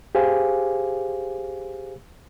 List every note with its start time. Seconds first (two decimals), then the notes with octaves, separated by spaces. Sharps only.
0.15 G4 G#4 C5 F5 G#5